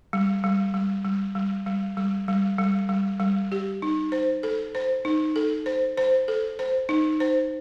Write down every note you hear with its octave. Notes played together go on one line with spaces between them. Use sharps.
G3
G3
G3
G3
G3
G3
G3
G3
G3
G3
G3
G4
D#4
C5
A4
C5
D#4
A4
C5
C5
A4
C5
D#4
C5